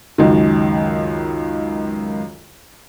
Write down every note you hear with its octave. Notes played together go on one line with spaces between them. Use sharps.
C#2 F#2 D#3